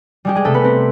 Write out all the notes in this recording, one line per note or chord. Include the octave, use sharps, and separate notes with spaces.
G3 G#3 G4
G#3 G#4
C3 A3 A4
B3 B4
C4